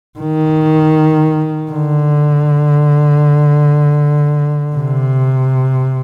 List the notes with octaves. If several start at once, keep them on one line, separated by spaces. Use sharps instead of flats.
D#3
D3
C3